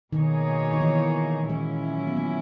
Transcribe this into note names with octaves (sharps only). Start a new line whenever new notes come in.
B2 D#3 A#3 D#4 G#4 C#5
D#3
E3
A#2 F#3 G#3 C#4 E4
B3
A#3